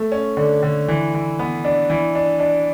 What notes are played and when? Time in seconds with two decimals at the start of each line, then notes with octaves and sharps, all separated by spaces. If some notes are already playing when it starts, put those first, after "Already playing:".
Already playing: A3
0.12 C#4
0.37 D3
0.63 D3
0.88 E3
1.14 E3
1.39 B3
1.65 D4
1.90 E3
2.15 D4
2.39 D4